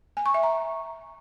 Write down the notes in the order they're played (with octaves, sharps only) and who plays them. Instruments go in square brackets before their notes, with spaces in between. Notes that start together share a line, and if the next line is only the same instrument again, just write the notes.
[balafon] G#5
C#6
E5
A#5